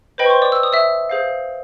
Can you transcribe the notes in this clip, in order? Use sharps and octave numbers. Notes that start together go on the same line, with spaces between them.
B4 C5 D#5 G5 B5
C#6
C5 C6
D5 D6
E6
D#6
E5 E6
G#4 C5 F5